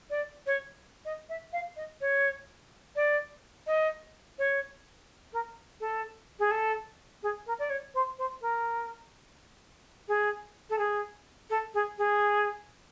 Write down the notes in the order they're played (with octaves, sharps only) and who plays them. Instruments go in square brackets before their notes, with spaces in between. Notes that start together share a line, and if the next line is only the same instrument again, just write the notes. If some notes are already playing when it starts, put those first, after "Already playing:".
[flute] D5
C#5
D#5
E5
F5
D#5
C#5
D5
D#5
C#5
A#4
A4
G#4
A4
G#4
A#4
D5
C#5
C5
C5
A#4
G#4
A4
G#4
A4
G#4
G#4